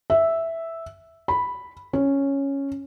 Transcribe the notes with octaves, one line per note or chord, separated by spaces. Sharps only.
E5
B5
C#4